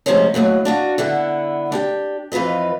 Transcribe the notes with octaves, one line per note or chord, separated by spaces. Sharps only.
A2 C3 F3 G#3 C4 C#4
D#2 A2 D3 F#3
D4 F4 F#4
D3 B3 E4 F#5
D4 G4 G5
F2 E3 F4 B4 D#5